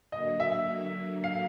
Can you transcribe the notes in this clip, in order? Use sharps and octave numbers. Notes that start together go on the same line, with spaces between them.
D3 F#3 A#3 D#5
E5
F5